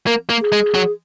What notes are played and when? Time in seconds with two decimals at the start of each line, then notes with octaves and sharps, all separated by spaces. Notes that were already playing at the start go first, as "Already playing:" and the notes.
0.07 A#3 A#4
0.30 A#3
0.41 G#4
0.52 G#3
0.75 F#3